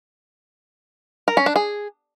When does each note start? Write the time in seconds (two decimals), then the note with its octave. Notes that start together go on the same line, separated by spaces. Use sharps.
1.28 A#4
1.37 C#4
1.46 D4
1.56 G#4